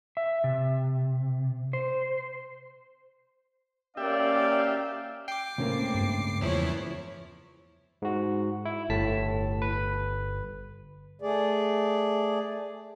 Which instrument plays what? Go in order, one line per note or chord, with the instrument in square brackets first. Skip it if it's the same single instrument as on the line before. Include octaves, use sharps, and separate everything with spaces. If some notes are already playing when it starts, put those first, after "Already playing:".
[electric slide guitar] E5
C3
C5
[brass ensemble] A#3 C#4 F5 [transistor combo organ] G4 E5 [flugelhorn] D5
[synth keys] G5 [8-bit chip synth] D6 C7
[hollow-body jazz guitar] C#2 C#3 A#3 [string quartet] A2 C4
[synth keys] G2
[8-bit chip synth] E2 F3 [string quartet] E4 C#5
[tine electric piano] G#2 F#4
E4
[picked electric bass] G1 [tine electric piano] A2 A5 B6
[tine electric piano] B4
[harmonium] A3 G#4 D5